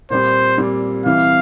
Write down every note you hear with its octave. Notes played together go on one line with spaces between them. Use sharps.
A#2 G3 C4 C5
A#2 G3 C4
C2 C3 E3 F5